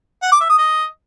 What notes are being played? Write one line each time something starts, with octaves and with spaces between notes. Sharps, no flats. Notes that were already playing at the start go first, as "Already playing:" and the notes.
F#5
D6
E5
D#6
D#5